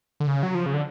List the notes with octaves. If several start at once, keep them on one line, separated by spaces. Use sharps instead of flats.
D3
C#3
F#3
F3
C#3
D3